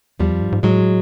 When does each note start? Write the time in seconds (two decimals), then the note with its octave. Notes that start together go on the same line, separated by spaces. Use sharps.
0.19 E2 F3 G3
0.31 F2
0.41 G2
0.52 G#2
0.63 A2 F#3 G#3